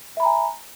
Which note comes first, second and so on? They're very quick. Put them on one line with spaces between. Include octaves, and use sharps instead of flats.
E5 B5 A#5 G#5